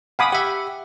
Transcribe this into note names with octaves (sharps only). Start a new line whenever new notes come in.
F5 F#5 G#5 B5 D6 D#6
G4 E5 F#5